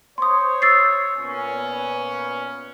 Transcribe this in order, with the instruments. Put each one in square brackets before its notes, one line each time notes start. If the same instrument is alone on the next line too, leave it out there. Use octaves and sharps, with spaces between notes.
[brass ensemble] C5 C#5 [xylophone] C6 D#6
[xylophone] E6 A6 C7
[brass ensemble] A#2 B3 C#4